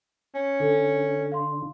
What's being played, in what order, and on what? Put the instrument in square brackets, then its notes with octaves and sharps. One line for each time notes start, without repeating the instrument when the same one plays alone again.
[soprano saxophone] C#4
[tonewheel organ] D3 [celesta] A4
[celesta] F5 C6